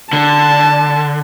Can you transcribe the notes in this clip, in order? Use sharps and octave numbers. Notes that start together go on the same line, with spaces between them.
D3 A5